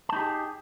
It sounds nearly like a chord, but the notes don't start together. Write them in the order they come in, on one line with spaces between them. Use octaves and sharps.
A5 D#4 G4 G#4